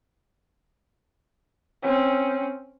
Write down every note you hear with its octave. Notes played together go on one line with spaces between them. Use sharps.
C4 C#4